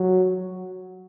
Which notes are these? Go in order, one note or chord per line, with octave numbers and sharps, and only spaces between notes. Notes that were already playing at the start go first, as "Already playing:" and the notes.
Already playing: F#3